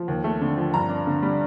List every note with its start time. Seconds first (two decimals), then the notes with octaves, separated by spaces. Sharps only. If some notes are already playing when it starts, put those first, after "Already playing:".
Already playing: F3
0.08 D#2
0.24 A3
0.41 D3
0.57 F3
0.74 G2 A#5
0.89 D4
1.07 D3
1.23 G3